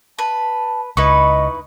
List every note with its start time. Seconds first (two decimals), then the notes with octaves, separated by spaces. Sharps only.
0.19 B4 A5
0.97 C#2 D#4 E4 B4 D#5 C#6